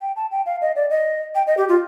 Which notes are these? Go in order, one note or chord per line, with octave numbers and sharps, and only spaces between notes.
G5
A5
G5
F5
D#5
D5
D#5
G5
D#5
G4
F4